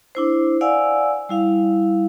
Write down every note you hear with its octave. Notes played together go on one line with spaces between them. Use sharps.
D4 E4 C5
D5 F5 F#5 G#5 E6
G3 E4 F5